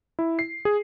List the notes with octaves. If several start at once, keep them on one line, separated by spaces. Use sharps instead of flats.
E4
C7
G#4